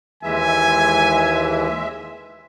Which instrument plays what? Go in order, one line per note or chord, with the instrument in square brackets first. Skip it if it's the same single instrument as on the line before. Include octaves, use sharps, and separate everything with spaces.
[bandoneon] D#2 E3 [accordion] G#3 E5 [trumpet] G#5